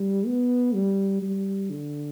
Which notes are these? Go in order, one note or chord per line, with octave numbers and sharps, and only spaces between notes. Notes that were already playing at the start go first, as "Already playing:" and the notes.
Already playing: G3
B3
G3
G3
D3